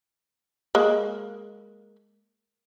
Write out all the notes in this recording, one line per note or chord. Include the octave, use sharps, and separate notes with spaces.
G#3 A#3